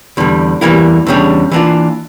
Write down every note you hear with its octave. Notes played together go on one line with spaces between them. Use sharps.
E2 D3 G3
E2 E3 G3 A#3 E4
E2 C#3 G3 D4
E3 A#3 D4 F4